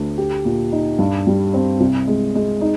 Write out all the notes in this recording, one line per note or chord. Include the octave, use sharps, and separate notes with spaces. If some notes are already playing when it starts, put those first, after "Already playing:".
Already playing: D2
G4
A#2
D#4
G2
G3
C4
C2
G#3
G#3
D#4